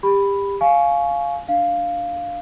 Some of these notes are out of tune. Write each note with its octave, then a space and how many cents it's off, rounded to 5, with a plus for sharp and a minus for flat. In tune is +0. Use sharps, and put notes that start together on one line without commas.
G4 +25 B5 +0
F5 +0 G#5 +20 C#6 +0
D4 +0 F5 +0